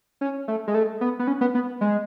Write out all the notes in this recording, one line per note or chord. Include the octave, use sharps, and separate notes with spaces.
C#4
A3
G#3
A3
B3
B3
C#4
B3
B3
G#3